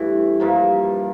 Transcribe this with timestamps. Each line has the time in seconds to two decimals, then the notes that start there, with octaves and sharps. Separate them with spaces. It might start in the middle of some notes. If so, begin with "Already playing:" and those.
Already playing: G2 E3 A3
0.40 G2 F3 A#3